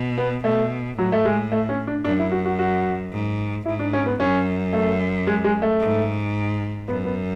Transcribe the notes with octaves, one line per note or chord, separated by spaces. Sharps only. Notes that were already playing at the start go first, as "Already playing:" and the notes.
Already playing: B2
B3
B2 A3
A2 F#3
A3
G#3
A3
C#4
D4
F#2 D4
E4
F#4
F#4
F#4
G#2
G#2 E4
D4
C#4
B3
F#2 C#4
A3
G#3
G#3
A3
G#2
F#2 B3
B3